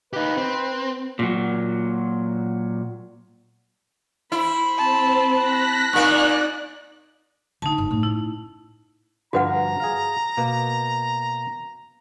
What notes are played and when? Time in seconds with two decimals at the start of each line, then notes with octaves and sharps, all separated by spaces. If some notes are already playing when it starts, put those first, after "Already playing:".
0.13 D#4 G4 B4
0.37 C4
1.19 A#2 F#3
4.32 E4 C5 B5
4.78 C4 A5
5.32 A5 F#6 A#6 B6
5.93 A#2 A#3 D#4 D5 F#6
7.62 D3 D#4 A5
7.78 G1
7.90 A2 C#4
8.03 E4
9.33 G2 D3 F3 F#4 B4 F#5 A#5
9.80 G#4 F5
10.37 B2 A#3 B3